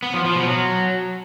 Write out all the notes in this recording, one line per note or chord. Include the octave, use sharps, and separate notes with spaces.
B3
F3
F3
B2
F#3